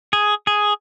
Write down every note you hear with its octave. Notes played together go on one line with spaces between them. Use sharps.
G#4
G#4